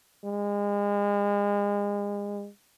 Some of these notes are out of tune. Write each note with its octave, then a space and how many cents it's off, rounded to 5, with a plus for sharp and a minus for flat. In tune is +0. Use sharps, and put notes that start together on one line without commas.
G#3 -35